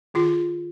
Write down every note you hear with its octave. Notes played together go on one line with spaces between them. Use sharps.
D#3 F4 G#4